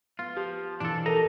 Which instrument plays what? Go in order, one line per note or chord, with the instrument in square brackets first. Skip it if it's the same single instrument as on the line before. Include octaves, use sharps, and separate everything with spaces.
[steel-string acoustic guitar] B3 [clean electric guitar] F4
[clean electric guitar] F3 [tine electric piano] G4
[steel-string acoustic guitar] B2 E3 [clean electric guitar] D4 A4
[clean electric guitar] D#4 D#5 A#5 [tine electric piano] A4 A#4 A5